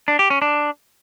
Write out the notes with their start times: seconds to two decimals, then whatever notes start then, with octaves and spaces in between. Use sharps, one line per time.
0.08 D4
0.19 G4
0.30 C#4
0.42 D4